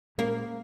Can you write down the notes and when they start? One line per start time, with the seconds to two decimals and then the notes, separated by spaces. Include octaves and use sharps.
0.18 A#2 G#3 A#3 C#4